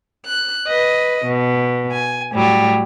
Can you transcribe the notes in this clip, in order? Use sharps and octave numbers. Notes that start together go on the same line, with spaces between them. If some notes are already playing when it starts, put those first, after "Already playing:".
F#6
B4 D#5
B2
G#5
A2 F#3 G3